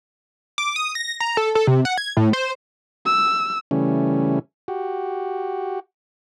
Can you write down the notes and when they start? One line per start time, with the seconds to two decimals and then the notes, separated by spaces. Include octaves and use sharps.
0.58 D6
0.76 D#6
0.95 A#6
1.20 A#5
1.37 A4
1.55 A4
1.67 C3
1.85 F#5
1.98 G#6
2.17 A2
2.33 C5
3.06 E6
3.71 C#3 E3 G3 A3 C#4
4.68 F#4 G4